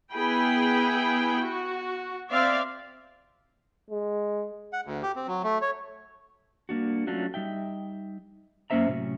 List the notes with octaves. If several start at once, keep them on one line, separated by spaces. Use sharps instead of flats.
B3 E4 G#4 G5 B5
F#4
C4 D5 E5 F5
G#3
F#5
D2
G4
C4
F#3
A3
C#5
G3 A#3 D4 F#4
F#3 A3 C#4 D4 F4 F#4
G3 D#4 E5 G5
F#2 A#3 C#4 C5 E5 A#5
A2 C3 F#3 C#4